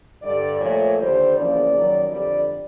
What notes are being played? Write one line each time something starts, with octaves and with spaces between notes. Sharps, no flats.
G2 D3 G3 D5
A#2 F3 A3 C#5
D#2 D3 G3 C5
E2 C#3 F3 A#3 D5
F#2 D#3 F#3
F2 D3 G3 D5